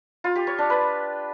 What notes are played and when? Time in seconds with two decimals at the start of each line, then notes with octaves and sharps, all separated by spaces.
0.24 F4
0.36 G4
0.47 C#5
0.58 D4
0.70 B4